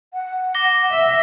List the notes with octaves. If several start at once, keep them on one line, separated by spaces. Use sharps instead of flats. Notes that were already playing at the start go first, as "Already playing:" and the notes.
F#5
D6 A#6 G7
E5